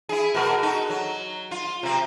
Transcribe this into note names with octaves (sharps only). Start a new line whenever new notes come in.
E4 G#4
B2 F#4 A#4
D#4 F#4 A4
F#3
F4
C3 C4